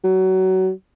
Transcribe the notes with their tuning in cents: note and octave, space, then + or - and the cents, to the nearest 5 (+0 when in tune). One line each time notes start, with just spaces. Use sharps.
F#3 +25